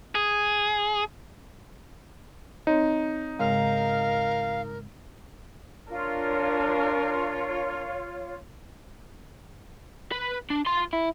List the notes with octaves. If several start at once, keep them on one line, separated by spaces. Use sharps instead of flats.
G#4
C4 D#4 C#5
G#2 C#3 G#3 A#4 F5
D4 F4 A#4 C#5
B4
D4
F4 C6
E4